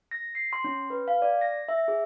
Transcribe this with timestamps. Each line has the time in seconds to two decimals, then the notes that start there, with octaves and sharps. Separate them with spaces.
0.11 A#6
0.35 C7
0.53 C6
0.64 C#4
0.90 B4
1.08 F5
1.22 D5
1.41 A#6
1.69 E5
1.88 G#4